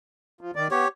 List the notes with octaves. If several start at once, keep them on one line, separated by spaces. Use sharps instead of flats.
F3
D#3 D5
B3 G4 C#5